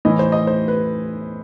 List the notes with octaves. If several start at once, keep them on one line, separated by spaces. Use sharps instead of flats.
A2 E3 D#5
C5
D#5
C5
B4